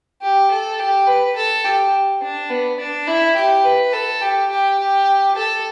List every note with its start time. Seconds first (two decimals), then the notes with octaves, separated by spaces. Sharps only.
0.22 G4
0.51 A4
0.79 G4
1.07 B4
1.37 A4
1.65 G4
2.22 D4
2.50 B3
2.80 D4
3.07 E4
3.36 G4
3.65 B4
3.93 A4
4.21 G4
4.50 G4
4.79 G4
5.36 A4